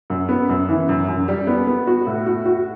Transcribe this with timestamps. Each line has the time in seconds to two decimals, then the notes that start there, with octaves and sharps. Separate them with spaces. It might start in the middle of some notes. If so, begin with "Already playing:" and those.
0.10 F#2
0.29 B3
0.49 F#2
0.69 E3
0.89 F#2
1.08 F#2
1.28 G3
1.47 B3
1.67 B3
1.87 F#4
2.07 A2
2.26 F#4
2.46 F#4